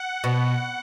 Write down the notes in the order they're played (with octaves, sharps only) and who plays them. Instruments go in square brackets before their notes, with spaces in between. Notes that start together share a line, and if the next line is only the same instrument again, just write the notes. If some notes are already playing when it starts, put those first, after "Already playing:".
Already playing: [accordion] F#5
[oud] B2